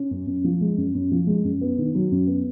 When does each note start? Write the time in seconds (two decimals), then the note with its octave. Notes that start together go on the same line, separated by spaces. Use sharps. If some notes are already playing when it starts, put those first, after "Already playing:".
Already playing: C#4
0.11 F#2
0.27 F#2
0.44 F3
0.61 G#3
0.77 F#2
0.95 F#2
1.11 F3
1.27 G#3
1.44 F#2
1.61 B3
1.78 D#3
1.95 F#3
2.11 F#2
2.27 B3